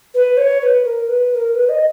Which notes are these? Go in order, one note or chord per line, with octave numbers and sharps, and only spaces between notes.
B4
C#5
B4
A#4
B4
B4
A#4
B4
D#5